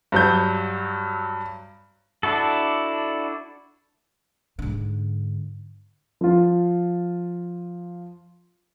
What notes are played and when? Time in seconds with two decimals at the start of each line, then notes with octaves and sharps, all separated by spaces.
0.12 G2 F#3 G6
2.23 D4 E4 F#4 A4
4.59 G#2 D3
6.21 F3 F4